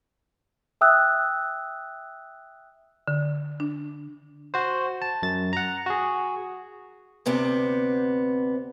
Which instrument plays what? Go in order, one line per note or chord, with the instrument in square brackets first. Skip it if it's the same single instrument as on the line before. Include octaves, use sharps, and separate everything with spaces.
[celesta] E5 G5 D#6 E6 F#6
[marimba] D3
D4
[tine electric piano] F#4 C5
A5
F#2 A6
F#5 A#5
F#4 G#4
[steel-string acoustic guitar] D2 C3 B3 C4